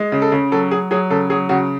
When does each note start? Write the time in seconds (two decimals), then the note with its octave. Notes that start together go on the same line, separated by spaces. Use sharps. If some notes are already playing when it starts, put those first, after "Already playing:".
Already playing: G#3
0.12 C#3
0.22 A4
0.32 C#3
0.52 F#3 A4
0.71 F#3 G#4
0.91 F#3 G#4
1.10 C#3 A4
1.30 F#3 G#4
1.49 C#3 F#4